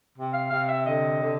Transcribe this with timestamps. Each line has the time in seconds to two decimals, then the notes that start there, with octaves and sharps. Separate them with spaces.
0.15 C3
0.33 F5
0.50 C3 F5
0.68 E5
0.85 D3 D#5
1.20 D3